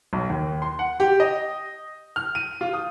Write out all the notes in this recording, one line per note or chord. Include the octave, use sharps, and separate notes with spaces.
B1
D#2
C6
F#5
G4
D#5
F6
D#7
F4
D#6